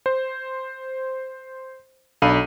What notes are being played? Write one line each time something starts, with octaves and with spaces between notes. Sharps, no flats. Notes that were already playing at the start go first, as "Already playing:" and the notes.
C5
B1 D4 A4 F5 B5 D#7